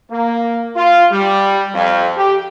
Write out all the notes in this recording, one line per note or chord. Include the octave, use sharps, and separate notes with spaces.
A#3
F4
G3
F2
G4